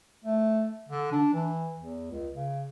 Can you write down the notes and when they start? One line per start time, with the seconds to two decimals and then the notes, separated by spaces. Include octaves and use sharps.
0.24 A3
0.88 D3
1.12 D4
1.34 E3
1.79 E2
2.11 C#2
2.35 C#3